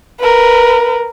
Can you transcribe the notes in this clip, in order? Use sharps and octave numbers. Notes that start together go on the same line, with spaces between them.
A#4 B4